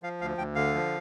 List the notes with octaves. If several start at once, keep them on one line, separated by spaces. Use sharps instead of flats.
F3 F5
D2 F5
D2 G5
D3 F5
F3